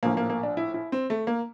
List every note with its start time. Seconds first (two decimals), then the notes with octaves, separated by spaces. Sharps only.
0.03 A#1 A2 F3 A#3
0.17 A#3
0.30 A#3
0.43 D4
0.57 E4
0.74 E4
0.92 C4
1.10 A3
1.27 A#3